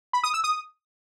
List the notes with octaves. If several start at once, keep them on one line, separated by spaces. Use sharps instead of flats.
B5
D#6
E6
D#6